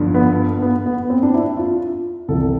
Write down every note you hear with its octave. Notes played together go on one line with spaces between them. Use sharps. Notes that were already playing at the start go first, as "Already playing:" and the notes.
Already playing: G1 G2 D3 F3
B3
B3
B3
C4
D4
E4
F4
C2 C3 E3 A4